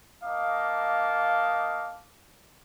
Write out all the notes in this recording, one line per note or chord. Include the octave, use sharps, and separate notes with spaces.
A#3 D#4 D#5 F5 A5 D6